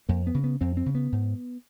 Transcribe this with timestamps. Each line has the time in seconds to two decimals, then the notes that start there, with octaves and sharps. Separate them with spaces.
0.09 F2 A#3
0.27 B3
0.34 C#3
0.44 B3
0.61 F2 C4
0.77 C4
0.86 C#3
0.95 B3
1.12 G#2